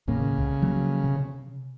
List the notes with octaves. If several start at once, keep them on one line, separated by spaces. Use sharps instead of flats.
D#2 A2 C#3 A#3
C2
F3 F#3 A#3
C3